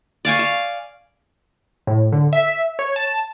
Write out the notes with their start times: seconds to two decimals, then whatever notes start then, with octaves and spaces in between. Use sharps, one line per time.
0.25 D5 F5 G#5 C#6
0.39 F5
1.87 A2
2.12 D3
2.33 E5
2.79 C#5
2.96 A5